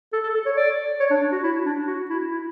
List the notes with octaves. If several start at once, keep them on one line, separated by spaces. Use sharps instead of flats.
A4
A4
A4
C#5
D5
C#5
D4
F#4
E4
D4
F#4
E4
E4